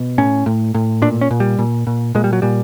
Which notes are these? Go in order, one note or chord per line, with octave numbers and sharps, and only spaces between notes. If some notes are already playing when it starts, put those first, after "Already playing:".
Already playing: B2
A2 C#4
A2
A2
A#2 D4
C#4
A#2
G3
A#2
A#2
A#2 G#3
G3
F#3
A#2 G3